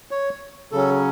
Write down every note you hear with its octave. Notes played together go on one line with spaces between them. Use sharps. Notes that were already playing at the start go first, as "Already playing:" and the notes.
C#5
C#3 F#3 C#4 A4